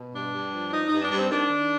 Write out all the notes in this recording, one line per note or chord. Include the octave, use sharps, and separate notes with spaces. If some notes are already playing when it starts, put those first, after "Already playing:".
Already playing: B2
G2 D4
G2
F3
F3 D#4
G2 D#4
D4
G2
C4
D#3 D4
D#3